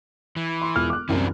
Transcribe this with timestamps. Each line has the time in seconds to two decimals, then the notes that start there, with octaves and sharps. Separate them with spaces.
0.36 E3
0.62 C6
0.75 E1 F4 F6
0.90 D6 F#6
1.09 C2 F#2 E3 C4 D4